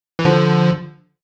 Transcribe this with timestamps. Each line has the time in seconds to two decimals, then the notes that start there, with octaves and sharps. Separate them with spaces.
0.19 E3
0.25 D3 F3